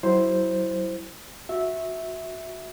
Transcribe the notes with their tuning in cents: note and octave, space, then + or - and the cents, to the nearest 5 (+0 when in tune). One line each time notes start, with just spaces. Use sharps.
F#3 +25 E4 +0 C5 +0
F#4 -20 E5 -10